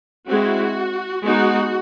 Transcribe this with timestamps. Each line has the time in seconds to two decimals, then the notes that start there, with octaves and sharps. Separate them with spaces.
0.28 G#3 C4 E4 F#4
1.22 G#3 B3 D#4 F#4